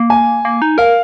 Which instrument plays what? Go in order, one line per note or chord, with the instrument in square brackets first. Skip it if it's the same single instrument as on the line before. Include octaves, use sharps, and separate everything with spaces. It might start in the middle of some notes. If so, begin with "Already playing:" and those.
Already playing: [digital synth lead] A#3
[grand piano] G#5
[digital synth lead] A#3
D#4
[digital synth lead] A#4 [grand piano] F5